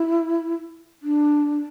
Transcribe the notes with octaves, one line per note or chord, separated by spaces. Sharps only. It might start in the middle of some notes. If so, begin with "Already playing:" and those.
Already playing: E4
D4